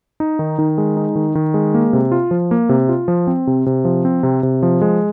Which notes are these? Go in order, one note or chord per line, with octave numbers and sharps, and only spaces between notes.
D#4
D#3
D#3
G#3
D#4
D#3
D#3
G#3
A#3
C3
F4
F3
A#3
C3
F4
F3
C4
C3
C3
F3
C4
C3
C3
F3
G#3